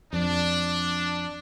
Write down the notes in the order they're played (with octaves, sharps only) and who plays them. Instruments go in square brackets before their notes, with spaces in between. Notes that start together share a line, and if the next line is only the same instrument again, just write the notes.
[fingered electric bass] F2 [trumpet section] D4